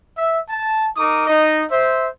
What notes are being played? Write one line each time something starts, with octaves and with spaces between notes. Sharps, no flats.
E5
A5
D#4 A#4 D6 D#6
D#4 D#5
C5 E5